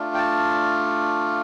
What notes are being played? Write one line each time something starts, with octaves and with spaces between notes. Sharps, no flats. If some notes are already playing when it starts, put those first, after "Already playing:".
Already playing: A3 D4 F4
G5
A5